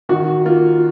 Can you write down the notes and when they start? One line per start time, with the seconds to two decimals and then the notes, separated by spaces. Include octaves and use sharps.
0.09 D#3 F#4
0.45 A#3 F4